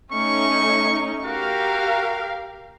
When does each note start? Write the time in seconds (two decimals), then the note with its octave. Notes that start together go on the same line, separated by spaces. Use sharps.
0.12 A3 C#4 D#4 C#6
1.25 F#4 G4 A#4 F5